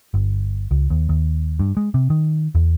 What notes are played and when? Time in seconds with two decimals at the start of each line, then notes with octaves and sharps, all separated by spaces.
0.14 G1
0.71 C#2
0.90 D#2
1.09 D#2
1.60 G2
1.77 G#3
1.94 C3
2.10 D#3
2.55 E2